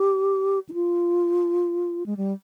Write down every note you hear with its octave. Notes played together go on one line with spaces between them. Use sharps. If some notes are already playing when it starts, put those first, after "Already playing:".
Already playing: G4
D#4
F4
G#3
G3